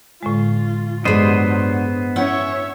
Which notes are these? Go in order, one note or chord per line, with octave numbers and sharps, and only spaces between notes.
A2 D3 G#3 F4
G2 F#3 G#3 B3 D4 G4 C5 D#5
C#4 E4 C#5 E5 F#5 G5